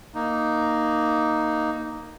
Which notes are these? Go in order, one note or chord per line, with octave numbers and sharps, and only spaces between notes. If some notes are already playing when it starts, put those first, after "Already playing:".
A#3 D#4